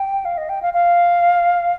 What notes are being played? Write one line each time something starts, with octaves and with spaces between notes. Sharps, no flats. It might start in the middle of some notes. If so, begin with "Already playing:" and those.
Already playing: G5
F5
D#5
G5
F5
F5